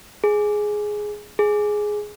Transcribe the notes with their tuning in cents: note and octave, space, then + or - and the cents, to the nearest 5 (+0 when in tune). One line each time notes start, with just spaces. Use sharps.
G#4 +5
G#4 +5